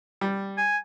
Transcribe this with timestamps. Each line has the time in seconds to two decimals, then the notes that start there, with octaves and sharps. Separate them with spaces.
0.21 G3
0.58 G#5